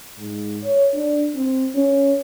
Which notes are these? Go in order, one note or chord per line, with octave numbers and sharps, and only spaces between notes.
G#2
C#5
D4
C4
C#4